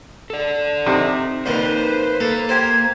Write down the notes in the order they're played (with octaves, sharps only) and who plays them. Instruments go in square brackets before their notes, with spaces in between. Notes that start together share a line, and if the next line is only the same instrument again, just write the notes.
[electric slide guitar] A4 D5
[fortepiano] C3 [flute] D#4
[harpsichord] F2 A#2 D#3 [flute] B4 [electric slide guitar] C5
[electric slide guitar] A#3 [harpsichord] A4
[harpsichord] G4 C5 [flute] G#6